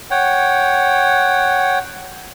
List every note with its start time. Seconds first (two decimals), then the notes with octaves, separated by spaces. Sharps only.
0.11 C#5 F#5 G5